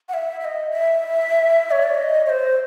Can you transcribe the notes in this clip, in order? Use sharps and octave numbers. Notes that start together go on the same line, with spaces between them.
F#5
E5
E5
D#5
E5
C#5
D5
D#5
C#5
C5